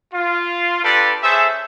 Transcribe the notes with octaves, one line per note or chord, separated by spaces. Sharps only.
F4
D4 F4 G4 A4 B4 D5
C#4 G#4 A4 C5 E5